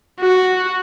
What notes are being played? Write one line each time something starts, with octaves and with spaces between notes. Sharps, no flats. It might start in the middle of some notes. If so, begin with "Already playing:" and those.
F#4